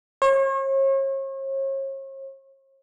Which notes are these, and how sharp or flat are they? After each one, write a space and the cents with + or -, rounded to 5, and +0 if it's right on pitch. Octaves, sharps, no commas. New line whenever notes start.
C#5 -40